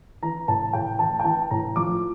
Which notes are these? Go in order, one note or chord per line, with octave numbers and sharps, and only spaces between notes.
E3 A#5
A2 A5
A2 G5
E3 A5
G5
E3 A5
A2 A#5
F3 D6